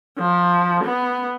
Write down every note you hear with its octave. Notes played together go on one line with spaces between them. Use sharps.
F3
B3